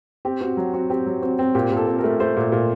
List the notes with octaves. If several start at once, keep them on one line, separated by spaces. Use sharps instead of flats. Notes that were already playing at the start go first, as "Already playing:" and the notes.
C4 G4
C4 F#4
F#3
C4 F#4
C4 G4
F#3
C4 F#4
C4
A#2 G4
A#2
A4
C4
A#4
A3
A3 C5
A#2
A#2